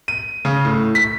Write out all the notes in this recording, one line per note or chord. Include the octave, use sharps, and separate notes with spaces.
D#7
C#3
A2
B6